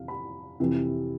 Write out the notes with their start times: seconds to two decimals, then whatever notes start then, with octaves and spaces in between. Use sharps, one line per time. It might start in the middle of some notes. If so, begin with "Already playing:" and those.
Already playing: F2 C3 E3 F5
0.08 B5
0.60 F2 C3 E3